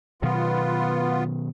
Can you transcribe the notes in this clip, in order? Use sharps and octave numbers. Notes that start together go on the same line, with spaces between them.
B2 D#3 F#3 B3 F4